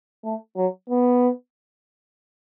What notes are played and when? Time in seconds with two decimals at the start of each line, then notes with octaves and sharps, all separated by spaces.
0.24 A3
0.57 F#3
0.90 B3